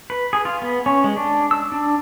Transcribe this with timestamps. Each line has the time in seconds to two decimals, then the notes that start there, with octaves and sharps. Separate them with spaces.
0.10 B4
0.33 G#4
0.45 F4
0.62 B3
0.86 C#4
1.04 G#3
1.17 D4
1.51 E6
1.72 D4